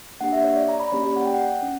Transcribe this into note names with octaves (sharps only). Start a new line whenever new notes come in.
A#3 D4 G4 F#5
E5
C#5
D5
A#5
B5
A#3 C#4 G4 C#5
D5
F#5
G5
F#5
C#4